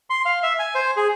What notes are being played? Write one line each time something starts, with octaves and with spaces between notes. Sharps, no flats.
C6
F5
E5
G#5
C5
G#4